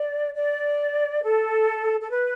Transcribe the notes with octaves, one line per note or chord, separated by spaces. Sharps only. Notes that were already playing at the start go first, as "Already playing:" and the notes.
Already playing: D5
D5
A4
A4
B4